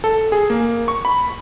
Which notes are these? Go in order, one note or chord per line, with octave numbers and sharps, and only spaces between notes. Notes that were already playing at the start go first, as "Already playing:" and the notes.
A4
G#4
A#3
C#6
B5